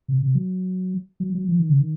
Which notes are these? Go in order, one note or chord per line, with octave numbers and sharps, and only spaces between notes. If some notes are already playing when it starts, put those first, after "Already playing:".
C3
C3
F#3
F#3
F#3
F3
D#3
C#3
D#3